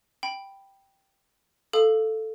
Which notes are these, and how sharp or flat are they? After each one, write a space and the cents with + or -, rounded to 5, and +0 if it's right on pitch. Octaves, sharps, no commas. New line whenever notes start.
G5 +0 B5 +0
A4 +0 F5 -10 D#6 -30